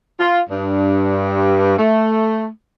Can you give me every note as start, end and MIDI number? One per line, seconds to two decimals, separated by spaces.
0.20 0.40 65
0.50 1.78 43
1.79 2.47 57